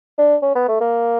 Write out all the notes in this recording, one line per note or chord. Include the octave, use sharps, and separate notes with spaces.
D4
C#4
B3
A3
A#3